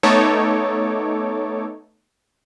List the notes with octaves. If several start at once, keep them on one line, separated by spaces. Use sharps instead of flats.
A3 B3 D#4 A4 C#5 D6